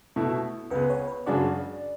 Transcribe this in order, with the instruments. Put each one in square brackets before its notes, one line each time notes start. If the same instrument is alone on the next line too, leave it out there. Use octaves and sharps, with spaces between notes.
[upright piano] B2 A3 E4
[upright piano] C#2 C#3 G#3 B3 [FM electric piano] B4
[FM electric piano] C#5
B4
[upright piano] F#2 C#3 G#3 D4 F#4 [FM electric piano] D5